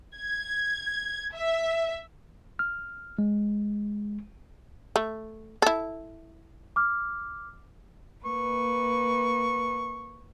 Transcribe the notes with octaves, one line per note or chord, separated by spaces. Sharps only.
G#6
E5
F6
G#3
A3
E4 A4
D6 F6
A#3 B4 C#6